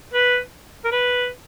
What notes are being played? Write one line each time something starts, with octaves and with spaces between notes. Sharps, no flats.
B4
A#4
B4